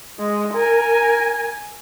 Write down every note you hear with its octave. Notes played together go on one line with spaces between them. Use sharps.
G#3
A#4 G#5